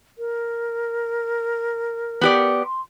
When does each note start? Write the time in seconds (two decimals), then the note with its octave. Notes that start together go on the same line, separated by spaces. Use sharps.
0.18 A#4
2.21 B3 G4 D5
2.65 C6